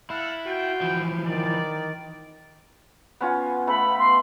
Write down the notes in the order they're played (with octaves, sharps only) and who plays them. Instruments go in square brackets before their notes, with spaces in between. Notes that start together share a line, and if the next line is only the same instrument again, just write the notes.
[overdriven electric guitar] E4 [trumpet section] A4 F5 F#5
[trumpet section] F4 G5 [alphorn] F#4
[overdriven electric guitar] E3 F3
[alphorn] D#3 [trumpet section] D5
[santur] B3 C#4 F4
[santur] A3 B3 [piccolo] B5
[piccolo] C6